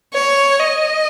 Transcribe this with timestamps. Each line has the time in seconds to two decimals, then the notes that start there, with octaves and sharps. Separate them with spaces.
0.14 C#5
0.59 D#5